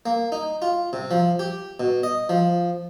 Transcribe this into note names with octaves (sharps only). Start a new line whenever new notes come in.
A#3
D#4
F4
C3
F3
G4
B2
D#5
F3